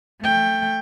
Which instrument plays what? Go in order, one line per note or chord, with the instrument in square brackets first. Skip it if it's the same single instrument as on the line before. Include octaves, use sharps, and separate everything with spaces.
[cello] A3 G5